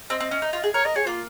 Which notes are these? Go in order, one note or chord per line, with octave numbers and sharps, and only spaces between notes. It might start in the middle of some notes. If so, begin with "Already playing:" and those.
C4 D#5
C4
C#4
D#4
F4
G#4
A#4 C#5
A#4 D#5
G#4 C#5
A#3 F4